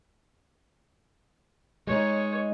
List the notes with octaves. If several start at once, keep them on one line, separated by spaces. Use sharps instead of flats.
G#3 D#4 C#5